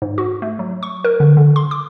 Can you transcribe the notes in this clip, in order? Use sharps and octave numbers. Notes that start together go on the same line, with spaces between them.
G#2
F#4
A3
F#3
C#6
A#4
D3
D3
C6
D6